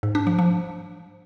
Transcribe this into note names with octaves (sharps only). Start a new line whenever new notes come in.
G#2
D4
F3
F3